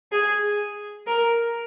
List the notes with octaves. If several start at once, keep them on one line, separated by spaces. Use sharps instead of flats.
G#4
A#4